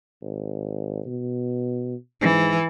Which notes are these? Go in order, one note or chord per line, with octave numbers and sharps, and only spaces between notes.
G#1
B2
G#2 E3